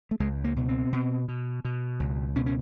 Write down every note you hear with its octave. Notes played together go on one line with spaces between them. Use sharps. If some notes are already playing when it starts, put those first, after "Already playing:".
A3
C#2 G#3
A#3
B2
C4
B2
B2
B2
C#2
B2 C#4
C#4